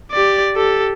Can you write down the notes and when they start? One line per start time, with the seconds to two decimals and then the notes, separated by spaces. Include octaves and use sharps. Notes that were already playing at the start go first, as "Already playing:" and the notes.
0.12 G4 D5
0.56 G4 A4